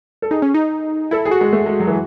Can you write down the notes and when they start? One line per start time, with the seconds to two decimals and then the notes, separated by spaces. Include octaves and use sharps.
0.22 A4
0.31 D#4 G#4
0.42 C#4
0.54 D#4
1.11 E4 A4
1.25 G#4
1.31 F#4
1.41 G#3
1.53 A3
1.66 G#3
1.80 F#3
1.87 E3